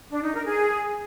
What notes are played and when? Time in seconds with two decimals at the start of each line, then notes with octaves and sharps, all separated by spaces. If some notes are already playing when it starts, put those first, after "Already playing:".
0.11 D4
0.22 D#4
0.34 A#4
0.46 G#4